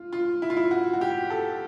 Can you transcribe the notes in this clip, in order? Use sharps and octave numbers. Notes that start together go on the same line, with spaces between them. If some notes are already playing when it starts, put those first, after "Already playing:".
Already playing: F4
F4
E4
F4
E4
F#4
F#4
G4
A4